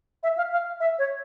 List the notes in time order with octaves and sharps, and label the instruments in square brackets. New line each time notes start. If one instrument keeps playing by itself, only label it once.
[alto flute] E5
F5
F5
E5
C#5